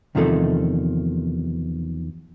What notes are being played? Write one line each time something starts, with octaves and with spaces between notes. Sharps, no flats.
E2 C3 D#3 F3 A3 A4